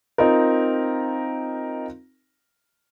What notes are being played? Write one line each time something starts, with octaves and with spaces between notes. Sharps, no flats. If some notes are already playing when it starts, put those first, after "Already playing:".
C4 D#4 F4 A#4